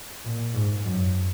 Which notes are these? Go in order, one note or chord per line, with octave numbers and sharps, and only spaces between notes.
A#2
G#2
F#2